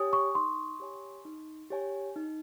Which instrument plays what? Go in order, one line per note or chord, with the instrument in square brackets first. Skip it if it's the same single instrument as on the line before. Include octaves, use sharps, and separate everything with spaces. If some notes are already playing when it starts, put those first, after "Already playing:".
Already playing: [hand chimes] G4 C#5 G#5 [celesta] D#6
[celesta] C#6
[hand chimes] D#4 [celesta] C6
[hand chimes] G4 C#5 G#5
D#4
G4 C#5 G#5
D#4